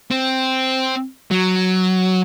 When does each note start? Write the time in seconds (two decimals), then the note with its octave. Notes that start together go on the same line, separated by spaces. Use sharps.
0.11 C4
1.31 F#3